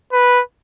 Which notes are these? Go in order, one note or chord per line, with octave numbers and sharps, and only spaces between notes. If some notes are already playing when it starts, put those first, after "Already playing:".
B4